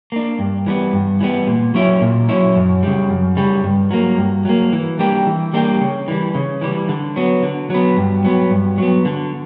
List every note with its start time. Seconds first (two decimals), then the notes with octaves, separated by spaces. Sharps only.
0.12 A#3 D4
0.39 G2
0.66 E3 G3 B3
0.93 G2
1.21 E3 G3 B3
1.47 A#2
1.75 F#3 C#4 E4
2.01 A#2
2.29 F#3 C#4 E4
2.56 F#2
2.83 C#3 G3
3.10 F#2
3.37 C#3 G3
3.64 G2
3.91 F#3 A#3
4.18 G2
4.45 F#3 A#3
4.73 E3
4.99 G3 A#3 D4 G4
5.26 E3
5.53 G3 A#3 D4 G4
5.81 C#3
6.08 E3 G3
6.35 C#3
6.61 E3 G3
6.89 D3
7.16 F#3 B3
7.43 D3
7.70 F#3 B3
7.97 G2
8.25 F#3 B3
8.51 G2
8.78 F#3 B3
9.05 D3